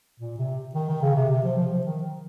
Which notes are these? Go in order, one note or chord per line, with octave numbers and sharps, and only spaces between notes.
A#2
C3
D#3
D#3
C#3
C3
C3
F3
F3
F3
D#3